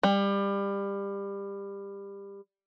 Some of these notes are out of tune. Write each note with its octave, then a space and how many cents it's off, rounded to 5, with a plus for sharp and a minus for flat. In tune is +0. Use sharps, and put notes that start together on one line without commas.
G3 +25